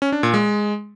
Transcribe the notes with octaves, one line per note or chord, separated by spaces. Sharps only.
C#4
D4
A#2
G#3